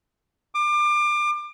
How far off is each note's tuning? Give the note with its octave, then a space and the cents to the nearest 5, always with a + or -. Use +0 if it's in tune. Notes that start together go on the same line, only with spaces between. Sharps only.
D6 +30